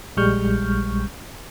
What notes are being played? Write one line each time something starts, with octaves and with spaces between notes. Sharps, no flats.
A#1 G3 G#3 C#6 F6 G6